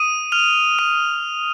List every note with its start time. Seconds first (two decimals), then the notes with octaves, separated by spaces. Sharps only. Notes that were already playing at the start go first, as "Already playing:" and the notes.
Already playing: D#6 D#7
0.32 F6 F7
0.79 D#6 D#7